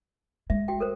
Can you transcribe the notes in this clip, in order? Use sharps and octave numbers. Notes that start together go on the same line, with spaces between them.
G#3 E5
F#4 G5
A4 A#4 C5